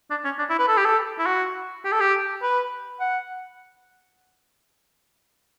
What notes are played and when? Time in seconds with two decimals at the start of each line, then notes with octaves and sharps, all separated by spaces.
0.11 D4
0.25 C#4
0.39 D4
0.50 E4
0.59 B4
0.68 A4
0.77 G4
0.85 A4
1.19 E4
1.26 F#4
1.85 G4
1.92 A4
2.01 G4
2.42 B4
3.00 F#5